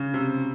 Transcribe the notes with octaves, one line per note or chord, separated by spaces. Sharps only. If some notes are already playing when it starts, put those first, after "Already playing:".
Already playing: C#3
C3